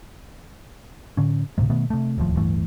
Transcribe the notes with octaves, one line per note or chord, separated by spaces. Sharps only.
A2 D3 C#4
D2 A2 C3 G#3
B2 D#3 A3 B3
C3 A3
D1 D#2 A2 F3
D1 G2 E3 A3